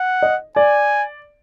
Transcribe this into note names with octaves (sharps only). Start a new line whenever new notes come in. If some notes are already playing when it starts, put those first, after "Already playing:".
Already playing: F#5
D#5
D5 G#5